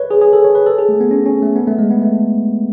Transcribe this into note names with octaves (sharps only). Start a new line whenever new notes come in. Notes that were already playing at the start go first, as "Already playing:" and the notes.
Already playing: B4 C#5
G#4
G#4
A4
C#5
B4
A4
G#4
A3
B3
C#4
C#4
A3
B3
A3
G#3
B3
A3